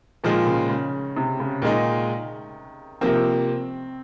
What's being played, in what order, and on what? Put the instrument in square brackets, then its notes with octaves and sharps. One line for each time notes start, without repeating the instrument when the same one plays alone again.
[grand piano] A#2 F3 G#3 [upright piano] D#3
[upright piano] C#3
C#3
C3
C#3
[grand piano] A#2 G#3 D#4 [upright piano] D#3
[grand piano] C3 F3 A#3 [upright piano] C4